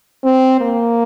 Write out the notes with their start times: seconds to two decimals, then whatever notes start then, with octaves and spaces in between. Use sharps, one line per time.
0.24 C4
0.61 A#3